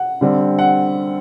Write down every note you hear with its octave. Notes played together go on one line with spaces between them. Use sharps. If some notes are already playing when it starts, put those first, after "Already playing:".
Already playing: F#5
D3 G3 C4
F#5